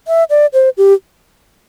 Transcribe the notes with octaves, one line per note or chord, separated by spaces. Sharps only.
E5
D5
C5
G4